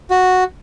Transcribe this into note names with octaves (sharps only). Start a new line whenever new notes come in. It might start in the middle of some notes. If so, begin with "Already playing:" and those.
F#4